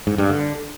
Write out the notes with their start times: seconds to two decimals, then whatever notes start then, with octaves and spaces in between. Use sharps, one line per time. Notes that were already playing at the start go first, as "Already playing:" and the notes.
0.07 G#2
0.18 G2
0.30 D3